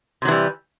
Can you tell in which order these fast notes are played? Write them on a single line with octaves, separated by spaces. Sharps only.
C3 F#3 E3 G3